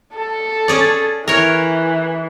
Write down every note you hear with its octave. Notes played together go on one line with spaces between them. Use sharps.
A4
C#4 G#4 D5
E3 A#4 C#5